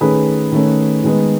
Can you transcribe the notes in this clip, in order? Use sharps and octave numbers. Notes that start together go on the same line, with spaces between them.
D#3 A3 C#4 G#4 B4
D#3 A3 C#4
D#3 G#3 B3